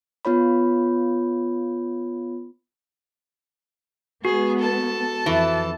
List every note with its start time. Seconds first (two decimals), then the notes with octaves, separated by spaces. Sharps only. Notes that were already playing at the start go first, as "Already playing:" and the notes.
0.25 B3 F4 C#5 B5
4.25 G#3 B3 F#4 G#4
4.59 A4 A5
5.26 F2 E3